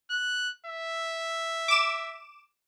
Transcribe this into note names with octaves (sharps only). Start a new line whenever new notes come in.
F#6
E5
D6 E7